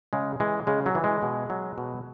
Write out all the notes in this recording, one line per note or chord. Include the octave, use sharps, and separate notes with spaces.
C#3 G#3
E3 G#3
C#3 G#3
F#3
E3
G#3
B2
F#3
B2